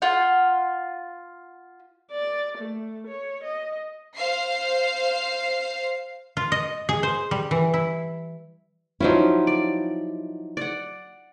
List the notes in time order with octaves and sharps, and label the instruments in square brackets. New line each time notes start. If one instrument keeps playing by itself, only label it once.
[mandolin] F4 F#5
[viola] D5
A3
C#5
D#5
[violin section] C5 F5 C7
[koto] F4
D#5
G#4
C5
G3
E3
E4
[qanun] F3 F#3 C#4 [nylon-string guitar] D#4 E4
[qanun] D5
D5 F#5